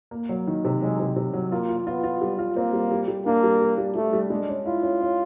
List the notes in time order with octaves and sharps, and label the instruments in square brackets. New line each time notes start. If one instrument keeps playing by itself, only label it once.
[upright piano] A#3
F#3
D#3
C3
[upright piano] F#3 [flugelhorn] G#3
[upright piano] C3
C3
F#3
[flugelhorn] A#3 [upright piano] F4
[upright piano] F4
[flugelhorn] B3 [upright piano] F4
[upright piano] F4
G3
F4
[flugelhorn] A#3 [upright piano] C4
[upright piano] G3
G3
G3
[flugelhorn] A#3 [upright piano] D4
[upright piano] G3
G3
G3
[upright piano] G3 [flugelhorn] A3
[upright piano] G3
[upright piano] G#3 [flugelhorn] D4
[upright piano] C#4
[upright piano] E4 [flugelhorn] F4
[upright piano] C#4
C#4